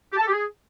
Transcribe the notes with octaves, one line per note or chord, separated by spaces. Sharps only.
G4
A5
A4
G4
G#4